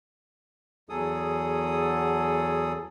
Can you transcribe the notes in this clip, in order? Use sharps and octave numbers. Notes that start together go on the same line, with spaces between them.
E2 F#3 G#4 A4 D#6